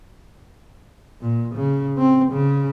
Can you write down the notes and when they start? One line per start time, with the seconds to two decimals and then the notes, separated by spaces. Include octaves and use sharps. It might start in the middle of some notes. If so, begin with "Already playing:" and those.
1.21 A#2
1.55 C#3
1.97 C4
2.32 C#3